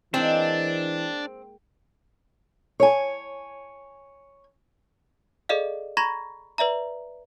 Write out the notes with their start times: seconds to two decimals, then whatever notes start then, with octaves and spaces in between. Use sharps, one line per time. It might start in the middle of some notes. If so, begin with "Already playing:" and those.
0.14 E3 G#3 A#3 C4 D4 D#4
2.80 C#5 G#5
5.49 G#4 A4 D5 D#5 F5
5.97 A#5 B5 C#6 G#6 A#6
6.58 B4 D5 E5 A#5